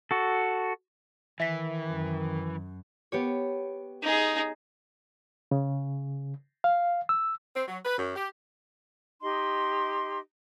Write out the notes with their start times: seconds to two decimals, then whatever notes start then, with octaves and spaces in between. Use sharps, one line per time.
0.11 F#4 A4
1.40 D#3 E3 E5 B6
1.86 F#2
3.12 B3 G4 C#5
4.03 D#4 G#4
5.51 C#3
6.64 F5
7.09 E6
7.56 C4
7.68 F#3
7.84 B4
7.98 F#2
8.16 G4
9.22 D#4 G4 D#5 C6